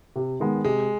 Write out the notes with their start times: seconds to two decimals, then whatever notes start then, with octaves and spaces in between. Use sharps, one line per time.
0.16 C3
0.40 D#3 G#3 B3
0.65 C3 G#3